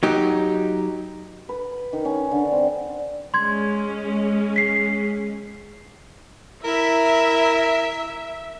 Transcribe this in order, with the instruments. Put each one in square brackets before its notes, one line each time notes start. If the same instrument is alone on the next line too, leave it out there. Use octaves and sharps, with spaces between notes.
[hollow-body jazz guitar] F#3 D#4 G4
[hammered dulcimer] B4
D#3
C#4
D3
C4
[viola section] G#3 C#4 [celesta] C6 G#6
[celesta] B6 C7
[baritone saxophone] E4 [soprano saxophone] A#4 [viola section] E5